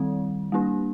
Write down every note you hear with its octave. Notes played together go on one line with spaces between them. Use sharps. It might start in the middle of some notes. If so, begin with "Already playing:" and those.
Already playing: D#3 G3 C4
G3 A#3 D4